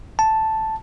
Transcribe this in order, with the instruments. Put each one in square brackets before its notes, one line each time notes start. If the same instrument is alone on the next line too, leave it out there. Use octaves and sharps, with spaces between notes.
[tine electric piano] A5